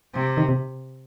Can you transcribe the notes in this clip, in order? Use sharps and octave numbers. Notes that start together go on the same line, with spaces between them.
C3
D#3
C3